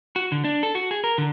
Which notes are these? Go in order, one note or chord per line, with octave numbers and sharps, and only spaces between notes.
F#4
D3
D4
A4
F#4
G#4
A#4
D3